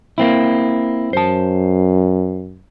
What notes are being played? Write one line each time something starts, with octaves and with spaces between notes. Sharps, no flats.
A#3 C4 E4
F#2 C5 A5